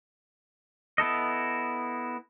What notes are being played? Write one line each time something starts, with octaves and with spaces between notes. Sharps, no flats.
B3 E4 A4 D#5